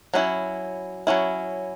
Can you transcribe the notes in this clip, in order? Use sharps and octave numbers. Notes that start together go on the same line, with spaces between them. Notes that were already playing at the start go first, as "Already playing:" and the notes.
F#3 C#4 E4
F#3 C#4 E4